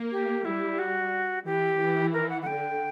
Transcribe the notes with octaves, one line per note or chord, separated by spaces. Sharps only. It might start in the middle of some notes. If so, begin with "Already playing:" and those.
Already playing: A#3
G4
G3 E4
F#4
E3 G4
E3
A#4
F#5
F#5
D3 G5